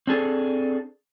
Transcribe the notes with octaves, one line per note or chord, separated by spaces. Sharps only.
C4 D4 G#4 A4